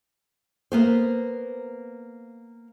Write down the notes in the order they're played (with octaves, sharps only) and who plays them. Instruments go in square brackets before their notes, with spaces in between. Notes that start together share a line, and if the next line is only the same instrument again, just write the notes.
[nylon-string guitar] A#3 B3 C5